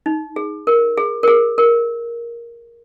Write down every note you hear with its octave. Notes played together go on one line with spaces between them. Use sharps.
D#4
G#4
A#4
G#4
A#4
G#4
A#4